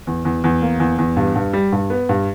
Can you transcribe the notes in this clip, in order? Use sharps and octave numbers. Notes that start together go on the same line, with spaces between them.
E2
E2
E2
A#3
E2
E2
G2
G2
G3
G2
B3
G2